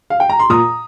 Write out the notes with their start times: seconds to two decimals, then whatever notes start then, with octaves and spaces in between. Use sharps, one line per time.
0.10 F5
0.20 G5
0.29 A#5
0.39 C6
0.50 A#2 A#5 D#6